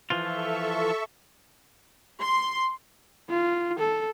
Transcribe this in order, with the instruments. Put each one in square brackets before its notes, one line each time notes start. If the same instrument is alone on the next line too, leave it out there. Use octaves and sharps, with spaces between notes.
[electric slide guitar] E3 F3 F4 [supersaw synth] A4 E5 C#6
[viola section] C6
[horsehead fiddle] F4
A4